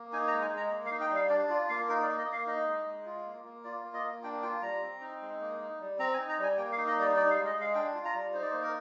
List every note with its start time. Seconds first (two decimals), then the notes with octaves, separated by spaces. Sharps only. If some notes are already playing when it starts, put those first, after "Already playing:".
Already playing: A#3
0.13 D#4 G#5
0.27 A#5
0.33 G#3
0.42 G#5
0.52 G#3 A#5
0.71 A#3
0.86 F5
0.91 D#4
1.01 G5
1.11 G3 F5
1.29 D4 D5
1.49 F4 D5
1.69 A#3 F5
1.88 D#4 A#4
2.03 D5
2.08 A#3
2.18 D#5
2.27 A#3
2.32 F5
2.47 D#4 D#5
2.67 G#3
2.86 G#3
3.06 F4
3.26 A#3
3.45 A#3
3.64 F4 D5
3.84 A#3
3.94 D#5
4.04 A#3
4.23 D4 G5
4.42 F4 G5
4.62 G3 A#5
4.82 C4
5.01 D#4
5.21 G#3
5.41 A#3
5.60 D#4
5.80 G3
5.98 C4 A#5
6.14 G#5
6.18 D#4
6.29 A#5
6.39 G3 G#5
6.57 A#3 G5
6.72 F5
6.77 D#4
6.87 D#5
6.96 G3
7.02 D5
7.16 D#4 D5
7.30 F5
7.36 G#3
7.46 D#5
7.56 G#3 F5
7.75 D4 G5
7.95 F4
8.05 A#5
8.14 G3
8.33 D#4 C5
8.42 D5
8.51 A#3 C5
8.63 A#4